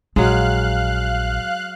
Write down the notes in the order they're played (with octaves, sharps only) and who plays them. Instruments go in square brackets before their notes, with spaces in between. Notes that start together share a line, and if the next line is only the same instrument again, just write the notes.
[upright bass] A#1 [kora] F#3 G#3 [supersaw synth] F5 F#6